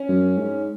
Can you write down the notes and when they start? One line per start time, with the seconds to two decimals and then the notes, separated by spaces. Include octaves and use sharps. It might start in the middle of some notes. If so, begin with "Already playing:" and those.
Already playing: C#4
0.09 F#2
0.39 G#2